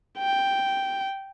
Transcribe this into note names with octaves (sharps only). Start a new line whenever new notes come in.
G5